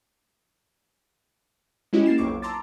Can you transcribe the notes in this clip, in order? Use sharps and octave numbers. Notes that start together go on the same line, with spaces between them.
G#3 C#4 E4 F#4 G4 D#5
A#3 A6 C7 E7
B1 F2 C#6 D6
A5 A#5 C6 D6 E6 A6